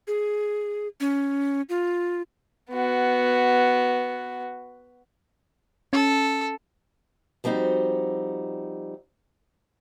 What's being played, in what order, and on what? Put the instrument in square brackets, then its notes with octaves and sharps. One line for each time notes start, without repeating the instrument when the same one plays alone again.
[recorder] G#4
C#4
F4
[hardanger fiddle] B3 F#4
[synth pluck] C#4 [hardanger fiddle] A4
[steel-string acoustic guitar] F3 G3 C4 D#4 F#4